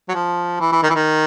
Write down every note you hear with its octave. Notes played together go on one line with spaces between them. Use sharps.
F#3
F3
E3
E3
D#3
E3
D#3